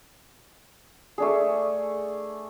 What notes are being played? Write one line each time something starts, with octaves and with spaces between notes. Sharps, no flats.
A3 D4 G#4